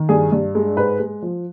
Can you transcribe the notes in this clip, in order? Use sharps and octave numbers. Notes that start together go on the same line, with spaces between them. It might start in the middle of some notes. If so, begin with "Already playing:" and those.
Already playing: D#3
G2 G#4
G2
G#3
G#2 B4
G#3
F3